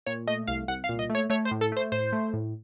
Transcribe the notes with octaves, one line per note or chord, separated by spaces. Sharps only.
A#2 C#5
A3 D#5
C2 F5
C2 F#5
F5
A#2
D#5
A3
C#5
A3 C#5
C5
A2
A4
A3 C5
A2 C5
A3
A2